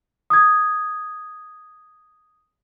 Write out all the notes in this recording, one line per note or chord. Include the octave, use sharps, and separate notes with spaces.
D#6 G#6